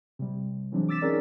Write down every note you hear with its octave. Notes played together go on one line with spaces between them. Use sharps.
C3 G3
E3 F#3 G#3 C4 D4
D6 E6 A6 B6 E7
C4 C#4 D#4 G#4 A#4 D5